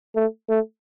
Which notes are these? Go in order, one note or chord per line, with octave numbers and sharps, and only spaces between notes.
A3
A3